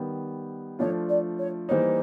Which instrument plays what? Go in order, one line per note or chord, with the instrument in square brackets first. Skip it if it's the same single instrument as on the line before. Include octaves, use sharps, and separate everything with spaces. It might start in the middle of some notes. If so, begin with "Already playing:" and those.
Already playing: [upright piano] D#3 G3 B3
[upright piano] F3 A3 D4 F4 [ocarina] C#5
[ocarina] D5
C#5
[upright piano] E3 G3 A#3 D#4 [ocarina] C5 C#5